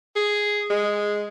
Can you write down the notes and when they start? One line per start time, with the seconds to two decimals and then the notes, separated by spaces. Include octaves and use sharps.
0.16 G#4
0.70 G#3